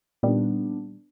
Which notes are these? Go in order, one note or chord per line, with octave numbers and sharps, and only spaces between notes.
A#2 D#3 G3 B3 D4